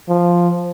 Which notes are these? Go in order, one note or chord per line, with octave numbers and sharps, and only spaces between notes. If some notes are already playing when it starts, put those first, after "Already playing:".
F3